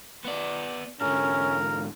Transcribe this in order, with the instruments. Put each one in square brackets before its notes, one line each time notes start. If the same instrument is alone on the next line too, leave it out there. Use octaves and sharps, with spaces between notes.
[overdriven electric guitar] B3 D5
[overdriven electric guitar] G#2 D3 [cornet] C#4 [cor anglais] A#4